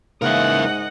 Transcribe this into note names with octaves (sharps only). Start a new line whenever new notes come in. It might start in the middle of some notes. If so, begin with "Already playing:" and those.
G#2 C#3 E3 A#3 A#4 D#5 E5 F#5